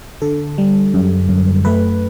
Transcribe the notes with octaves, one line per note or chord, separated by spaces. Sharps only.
D3 A4
G3
F#2
F#2
A3 B4